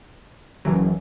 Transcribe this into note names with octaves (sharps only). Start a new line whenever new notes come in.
F#1 F#2 E3 F#3